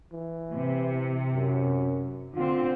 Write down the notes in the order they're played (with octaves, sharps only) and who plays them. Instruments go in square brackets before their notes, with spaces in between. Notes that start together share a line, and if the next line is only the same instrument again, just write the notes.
[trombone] E3
[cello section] C3
[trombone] F#2
[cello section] D3 C4 [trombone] F4